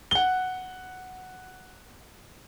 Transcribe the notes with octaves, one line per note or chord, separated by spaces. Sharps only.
F#5 G7